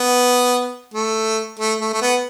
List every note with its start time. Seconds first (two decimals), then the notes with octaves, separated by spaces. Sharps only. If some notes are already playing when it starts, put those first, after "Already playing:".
Already playing: B3
0.94 A3
1.59 A3
1.81 A3
1.93 A3
2.02 B3